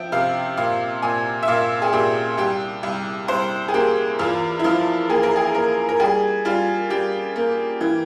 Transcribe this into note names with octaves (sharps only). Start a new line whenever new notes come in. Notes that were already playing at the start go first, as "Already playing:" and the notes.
Already playing: F3 E5 G5
C3 F5
A#2 F5
A#2 G#5
E5
A#2 F5
G#4
A#2 G4
C2 G4
C2
C2 C5
G#4
A#3 G4
E2 F4
E4
F3 F4
A#3 G#4
A#4
G#4
A#3 A#4
A#4
G3 G#4
G3 F4
G3 G4
A#3
E3